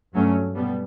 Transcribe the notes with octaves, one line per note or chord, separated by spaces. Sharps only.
G2 F#3 A3 C#4
B2 G3 B3